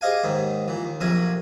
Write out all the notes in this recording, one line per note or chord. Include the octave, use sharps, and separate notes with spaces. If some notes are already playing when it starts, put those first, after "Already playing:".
G4 G#4 C5 D#5 F5 G#5
D#2 G#2 D#3
A#2 E3
D#2
A#1 F2 C3 F#3 A#4 G#5